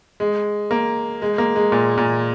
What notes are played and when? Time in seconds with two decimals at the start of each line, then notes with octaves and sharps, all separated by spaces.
0.20 G#3
0.71 A#3
1.22 G#3
1.38 A#3
1.56 G#3
1.72 A#2
1.98 A#2